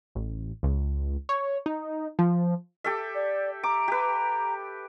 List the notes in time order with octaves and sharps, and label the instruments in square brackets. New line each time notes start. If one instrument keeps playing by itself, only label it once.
[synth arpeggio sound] A1
C#2
C#5
D#4
F3
[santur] G4 A4 E5
[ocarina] D5
[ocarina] A#5 [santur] D6
[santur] G4 B4